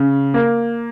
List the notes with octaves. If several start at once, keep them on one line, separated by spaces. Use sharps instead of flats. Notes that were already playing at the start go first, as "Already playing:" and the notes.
Already playing: C#3
A#3